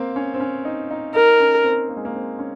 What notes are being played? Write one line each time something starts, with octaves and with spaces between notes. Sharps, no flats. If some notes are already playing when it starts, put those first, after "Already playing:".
Already playing: A#3 C4
C#4
C4
C#4
D#4
D#4
D#4 A#4
C#4
C4
A#3
G#3
A#3
C4
C#4